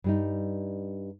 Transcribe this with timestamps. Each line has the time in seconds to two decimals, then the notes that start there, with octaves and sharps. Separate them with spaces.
0.04 G2 G3 D#4